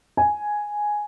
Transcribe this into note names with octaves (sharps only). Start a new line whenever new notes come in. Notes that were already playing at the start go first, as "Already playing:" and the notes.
G#5